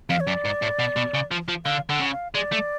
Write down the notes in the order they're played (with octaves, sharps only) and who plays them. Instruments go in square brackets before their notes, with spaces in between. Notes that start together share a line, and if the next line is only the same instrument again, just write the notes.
[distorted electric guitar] F2 [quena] F5
[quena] C#5
[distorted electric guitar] F#2 [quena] D5
[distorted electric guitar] G#2
A2
B2
B2
C#3
F3
F3
[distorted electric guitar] D3 [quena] F5
[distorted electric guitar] D3 [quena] F#5
[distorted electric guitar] C#3
[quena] F5
[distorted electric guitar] G#3 [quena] D5
[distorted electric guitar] A3